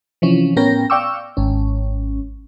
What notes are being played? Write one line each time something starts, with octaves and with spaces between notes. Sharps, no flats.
C3 E3 F3 C#4
A2 B3 C#4 A#4 G5 A#6
D5 F5 G5 C#6 D6 E6
G#1 C#4